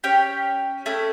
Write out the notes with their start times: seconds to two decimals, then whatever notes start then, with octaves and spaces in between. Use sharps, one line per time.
0.04 C#4 G4 C#5 G5
0.86 A3 C#4 E4 A4